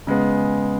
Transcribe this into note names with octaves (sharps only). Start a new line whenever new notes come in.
C#3 G#3 B3